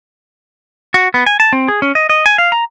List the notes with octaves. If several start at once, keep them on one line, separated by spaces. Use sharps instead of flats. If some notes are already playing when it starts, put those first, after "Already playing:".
F#4
B3
G#5
A5
C4
G#4
C#4
D#5
D#5
G#5
F5
A#5